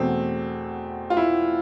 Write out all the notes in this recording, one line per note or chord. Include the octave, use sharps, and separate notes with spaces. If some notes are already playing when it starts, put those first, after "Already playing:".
Already playing: E2 B2 A3 C4
F4
E4